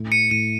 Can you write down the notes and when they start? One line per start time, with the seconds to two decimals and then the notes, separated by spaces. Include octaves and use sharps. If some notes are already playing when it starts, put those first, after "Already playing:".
Already playing: A2 E4
0.12 C#7 D#7
0.30 A2 C#7 D#7